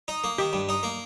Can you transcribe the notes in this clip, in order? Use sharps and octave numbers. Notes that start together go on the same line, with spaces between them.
D#4
A#3
D#3 G4
G2
D#4
A#3